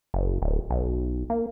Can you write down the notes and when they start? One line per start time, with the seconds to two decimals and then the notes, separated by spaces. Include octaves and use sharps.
0.14 F#1
0.42 D1
0.70 B1
1.30 A#3